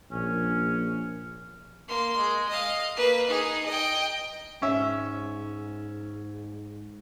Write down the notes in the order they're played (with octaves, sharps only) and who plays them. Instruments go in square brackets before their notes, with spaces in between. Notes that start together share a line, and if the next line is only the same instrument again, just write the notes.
[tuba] A#1 [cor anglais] C#4
[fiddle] A#3 C6
G#3
D#5 F5
A#3 B4
D#4 G#4
D#5 G5
[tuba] G#2 [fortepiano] C#4 E5